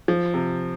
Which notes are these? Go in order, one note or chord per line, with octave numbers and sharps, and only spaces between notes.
F3
C3